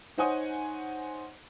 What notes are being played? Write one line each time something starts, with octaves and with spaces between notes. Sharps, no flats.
D#4 C5 C#5 F#5 G#5 D#6